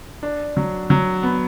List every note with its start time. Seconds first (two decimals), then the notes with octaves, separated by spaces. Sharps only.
0.23 D4
0.57 F#3
0.90 F#3
1.23 B3